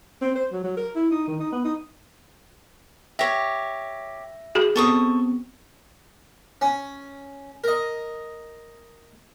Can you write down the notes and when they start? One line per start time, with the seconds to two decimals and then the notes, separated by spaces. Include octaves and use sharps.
0.22 C4
0.35 C5
0.52 F#3
0.64 F#3
0.77 A#4
0.96 E4
1.11 D#4
1.27 D#3
1.40 D#4
1.52 B3
1.65 D#4
3.19 G4 C#5 E5 A#6
4.55 F#4 G#4
4.76 B3 C4 A4 C#6 D#6
6.61 C#4
7.64 A#4 D#5